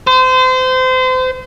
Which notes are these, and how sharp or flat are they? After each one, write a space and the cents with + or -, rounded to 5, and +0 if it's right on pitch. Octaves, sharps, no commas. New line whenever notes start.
C5 -30